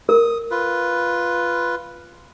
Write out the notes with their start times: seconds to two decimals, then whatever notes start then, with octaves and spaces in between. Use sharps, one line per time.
0.09 A#4 D#6
0.51 F4 B4